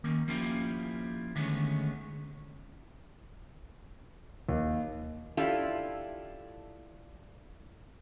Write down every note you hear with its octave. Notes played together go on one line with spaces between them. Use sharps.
D#3 A#3 C#4
F3 A#3 C#4 E4 F4 G4
D3 D#3 G#3 A3 B3 C#4
D#2
D4 E4 F4 G4 A4